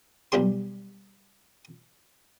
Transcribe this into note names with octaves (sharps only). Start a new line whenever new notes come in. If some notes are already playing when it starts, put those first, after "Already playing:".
B1 G3 D4 G4 C6